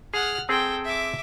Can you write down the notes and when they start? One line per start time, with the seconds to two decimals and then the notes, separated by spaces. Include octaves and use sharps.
0.14 G#4 F#5 F6
0.49 C4 G#4 A4 G5
0.85 E5 D6